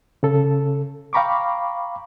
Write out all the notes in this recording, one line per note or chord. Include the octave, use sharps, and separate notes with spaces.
C#3 A4
F5 G5 A#5 B5 C#6 D6